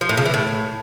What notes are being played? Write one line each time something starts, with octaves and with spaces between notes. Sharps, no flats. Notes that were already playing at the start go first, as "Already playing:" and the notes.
F3
A2
C#3
E3
A2